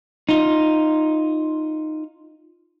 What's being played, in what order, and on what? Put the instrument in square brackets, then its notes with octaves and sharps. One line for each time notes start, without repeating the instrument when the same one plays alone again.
[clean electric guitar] D#4 F4